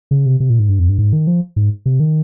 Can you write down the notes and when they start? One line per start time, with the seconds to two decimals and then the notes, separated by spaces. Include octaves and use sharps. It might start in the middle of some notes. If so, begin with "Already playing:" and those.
0.11 C#3
0.26 C3
0.40 C3
0.50 A#2
0.59 G#2
0.69 G2
0.79 F2
0.89 G2
0.98 G#2
1.13 D#3
1.27 F3
1.56 G#2
1.86 C3
2.00 D#3